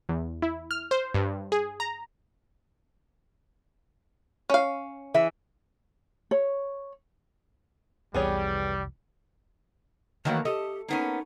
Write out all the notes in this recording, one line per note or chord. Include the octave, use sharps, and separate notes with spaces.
E2
E4
F6
C5
G2
G#4
A#5
C#4 F5
E3 G#4 E5
C#5
F1 C2 E3 G3 B3 G#4 C#5
D#3 E3 F#3 A3 A#3 C#5
G4 A4 D#5
A#3 B3 C#4 D#4